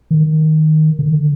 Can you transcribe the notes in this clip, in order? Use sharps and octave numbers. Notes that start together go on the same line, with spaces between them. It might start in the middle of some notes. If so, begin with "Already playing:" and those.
D#3
D3